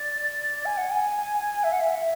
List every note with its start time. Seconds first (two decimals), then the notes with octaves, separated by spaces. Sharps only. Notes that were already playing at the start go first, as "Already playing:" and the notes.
Already playing: D5
0.65 G#5
0.77 F#5
0.90 G#5
1.63 E5
1.72 F#5
1.80 E5